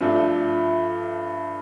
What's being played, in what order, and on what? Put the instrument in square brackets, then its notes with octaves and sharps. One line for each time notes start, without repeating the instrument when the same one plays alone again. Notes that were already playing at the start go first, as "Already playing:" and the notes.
[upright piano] G2 F3 A3 D4